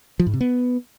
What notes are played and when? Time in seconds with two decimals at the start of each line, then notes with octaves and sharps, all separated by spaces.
0.20 F3
0.27 G#2
0.34 C3
0.41 B3